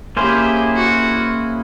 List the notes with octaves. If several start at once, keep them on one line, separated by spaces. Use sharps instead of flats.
A#3 C#4 E4 G4 G#4 C5
F#4